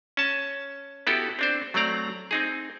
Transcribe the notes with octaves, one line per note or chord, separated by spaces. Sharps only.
C#4 A5
B3 E4 F#4 G4 A4
C4 D4 C5
F#3 A3 C4 D5 A#5
C4 D#4 G#4